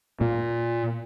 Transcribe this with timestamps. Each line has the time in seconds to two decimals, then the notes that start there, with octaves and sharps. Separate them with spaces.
0.21 A#2